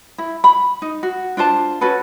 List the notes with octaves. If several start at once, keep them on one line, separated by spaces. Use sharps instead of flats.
E4
B5
D#4
F#4
D4 F4 C5 A5
C#4 F#4 A4 B4